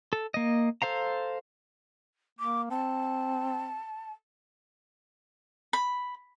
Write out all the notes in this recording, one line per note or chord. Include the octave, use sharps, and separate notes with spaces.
A4
A#3 D#5
A4 C5 F5 A#5
A#3 D6
C4 A5
B5